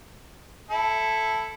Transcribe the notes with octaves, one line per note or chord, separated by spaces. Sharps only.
E4 A4